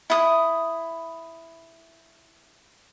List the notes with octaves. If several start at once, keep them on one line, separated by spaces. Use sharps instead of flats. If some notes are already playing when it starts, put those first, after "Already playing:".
E4 D#6